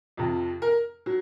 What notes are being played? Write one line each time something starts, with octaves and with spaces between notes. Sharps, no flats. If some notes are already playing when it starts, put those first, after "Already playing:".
F2 C3 F3
A#4
F#3